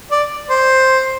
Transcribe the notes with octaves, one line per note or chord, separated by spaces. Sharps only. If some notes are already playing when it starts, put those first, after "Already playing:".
D5
C5